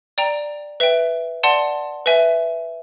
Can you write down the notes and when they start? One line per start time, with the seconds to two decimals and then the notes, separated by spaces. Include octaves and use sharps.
0.18 D5 G5 A#5
0.80 B4 E5 G5
1.43 D5 F#5 A5 C6
2.06 B4 E5 G#5